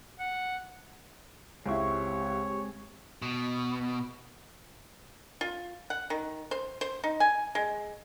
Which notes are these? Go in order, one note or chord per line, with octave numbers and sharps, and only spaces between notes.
F#5
C#2 G#3 C4 E4 G4 C#5 C#6
B2
F4
F#5
D#3
C5
C5
D#4
G#5
G#3